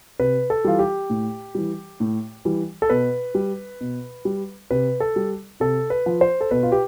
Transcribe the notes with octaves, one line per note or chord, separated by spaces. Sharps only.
C3 B4
A4
E3 G3 F4
G4
A2
E3 G3
A2
E3 G3
A4
B2 B4
G3
B2
G3
C3 B4
A4
G3
C3 A4
B4
F3
C5
A4
B2 B4
F4
G4